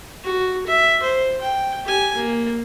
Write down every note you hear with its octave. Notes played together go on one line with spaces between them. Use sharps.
F#4
E5
C5
G5
G4 G#5
A#3